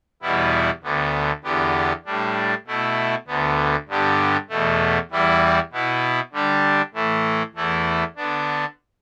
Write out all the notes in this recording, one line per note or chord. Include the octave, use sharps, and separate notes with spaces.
E2 B2 G3 B3 E4
D2 D3 B3
E2 D3 B3 G4
A2 G3 D4
B2 A3 E4
D2 D3 B3
G2 D3 B3 G4
E2 B2 A3
E2 E3 G3 E4 G4
B2 B3 E4
D3 G3 D4 G4
A2 E3 A3
E2 E3 A3 E4
D3 B3 D4